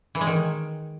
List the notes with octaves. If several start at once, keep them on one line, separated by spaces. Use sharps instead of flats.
E3
G#3
D#3